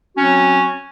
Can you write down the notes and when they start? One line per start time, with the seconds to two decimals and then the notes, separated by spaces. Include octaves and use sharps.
0.16 F#3 C4 C#4 F#4